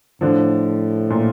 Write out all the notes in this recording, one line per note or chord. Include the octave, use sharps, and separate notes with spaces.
A2 D3 F3
A#2